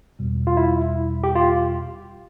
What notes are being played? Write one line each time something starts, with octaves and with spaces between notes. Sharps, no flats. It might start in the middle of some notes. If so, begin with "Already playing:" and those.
E2 B2 G3
F4
E4
G4
F4